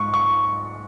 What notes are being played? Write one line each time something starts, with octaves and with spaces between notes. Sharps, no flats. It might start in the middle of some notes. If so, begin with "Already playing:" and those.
Already playing: G#2 C#6
C#6